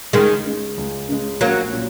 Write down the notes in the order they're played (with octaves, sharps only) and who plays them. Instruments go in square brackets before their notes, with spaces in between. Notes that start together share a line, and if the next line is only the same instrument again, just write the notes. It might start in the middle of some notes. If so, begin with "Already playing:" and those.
[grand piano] C#2 [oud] D#3 G#3
[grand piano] C#3 G#3
C#2
C#3 G#3
[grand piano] A#1 [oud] F#3 A#3
[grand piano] A#2 F#3